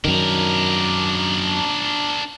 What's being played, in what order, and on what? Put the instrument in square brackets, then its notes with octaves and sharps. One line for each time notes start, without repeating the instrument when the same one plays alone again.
[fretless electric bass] F#2 D#3 [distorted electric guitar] D4 A#4